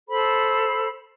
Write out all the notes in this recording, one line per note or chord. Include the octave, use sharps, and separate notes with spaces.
A4 C5 B5